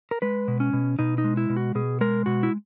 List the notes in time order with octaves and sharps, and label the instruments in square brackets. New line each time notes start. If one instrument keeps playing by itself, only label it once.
[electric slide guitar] A#4
G#3 B4
B2
C#4
B2
B2 D#4
D#4
G#3
E4
B2
F#4
B2 G#4
G#3 A#4
B2 F#4
E4